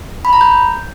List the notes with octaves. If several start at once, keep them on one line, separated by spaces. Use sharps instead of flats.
B5
A#5
G6